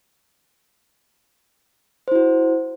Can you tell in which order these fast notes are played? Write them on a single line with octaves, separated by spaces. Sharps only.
C5 E4 F#4